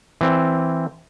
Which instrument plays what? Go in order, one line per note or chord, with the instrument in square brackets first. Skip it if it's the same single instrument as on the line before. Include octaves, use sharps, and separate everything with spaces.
[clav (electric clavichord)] E3 C4